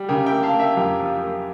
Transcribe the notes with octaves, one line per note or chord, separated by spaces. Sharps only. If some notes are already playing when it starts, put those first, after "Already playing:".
Already playing: G3
C#3 G4 A#4
E5 G5
A#3
F5 A5
A#3
E5 G5
F2 G4 A#4
F3
A#3